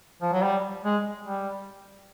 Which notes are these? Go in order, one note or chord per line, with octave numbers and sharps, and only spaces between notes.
F3
F#3
G3
G#3
G3